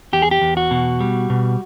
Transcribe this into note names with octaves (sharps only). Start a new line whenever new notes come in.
E2 G4
G#4
G4
E2
F#4
B2
G3
B2